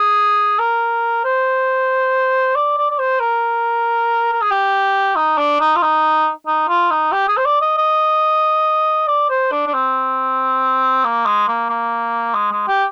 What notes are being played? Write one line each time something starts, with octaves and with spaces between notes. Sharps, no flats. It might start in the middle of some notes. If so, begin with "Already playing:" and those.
Already playing: G#4
A#4
C5
D5
D5
D5
C5
A#4
A#4
G#4
G4
D#4
D4
D#4
F4
D#4
D#4
F4
D#4
G4
G#4
C5
D5
D#5
D#5
D5
C5
D4
D4
C4
A#3
G#3
A#3
A#3
G#3
G#3
G4